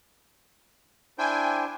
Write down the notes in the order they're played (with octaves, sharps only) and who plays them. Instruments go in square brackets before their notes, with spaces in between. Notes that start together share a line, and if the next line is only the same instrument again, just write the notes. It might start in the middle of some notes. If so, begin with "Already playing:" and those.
[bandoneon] D4 E4 C5 [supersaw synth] G5 G#5